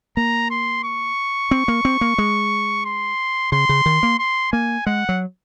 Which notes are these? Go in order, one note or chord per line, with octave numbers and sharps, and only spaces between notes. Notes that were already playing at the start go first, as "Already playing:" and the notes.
A#3 A#5
C6
C#6
C4
A#3
C4
A#3
G#3
C6
C#3 C6
C#3
D#3
A#3
C6
A#3 G#5
G#3 F#5
F#3